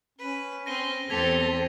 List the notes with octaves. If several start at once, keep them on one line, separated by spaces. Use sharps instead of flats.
C#4 B4
C4 A#6 D#7 G7
E2 C4 G4 A4 C5 G#6 B6 F7